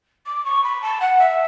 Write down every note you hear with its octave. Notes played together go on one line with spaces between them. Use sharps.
D6
C#6
B5
A5
F#5
E5